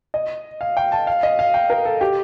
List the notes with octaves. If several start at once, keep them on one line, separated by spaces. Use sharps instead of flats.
D#5
F5
G5
A5
F5
D#5
F5
G5
A#4
A4
G4